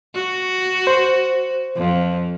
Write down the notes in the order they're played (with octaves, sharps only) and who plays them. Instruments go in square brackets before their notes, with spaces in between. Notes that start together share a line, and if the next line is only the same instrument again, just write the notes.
[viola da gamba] F#4
[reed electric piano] C5
[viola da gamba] F2